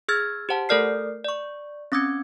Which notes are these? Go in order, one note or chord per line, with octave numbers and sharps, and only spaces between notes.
G#4 E6 F6 G#6 A6
G4 C5 F#5 A5
A3 A4 A#4 D5 F6 C7
D5 C#6
C4 C#4 D6 E6 G#6 C#7